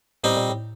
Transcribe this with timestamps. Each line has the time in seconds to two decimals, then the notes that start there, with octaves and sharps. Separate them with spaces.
0.24 A2 G3 C4 D#4
0.36 A#2
0.49 A2